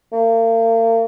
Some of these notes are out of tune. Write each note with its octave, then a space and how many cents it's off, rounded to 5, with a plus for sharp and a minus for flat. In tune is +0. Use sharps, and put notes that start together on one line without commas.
A#3 -40